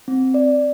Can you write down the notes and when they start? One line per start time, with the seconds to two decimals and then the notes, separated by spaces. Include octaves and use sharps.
0.08 C4
0.34 D5